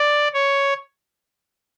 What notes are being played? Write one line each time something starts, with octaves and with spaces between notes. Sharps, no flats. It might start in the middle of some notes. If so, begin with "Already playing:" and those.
Already playing: D5
C#5